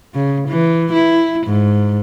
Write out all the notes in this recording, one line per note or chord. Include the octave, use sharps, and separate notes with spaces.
C#3
E3
E4
G#2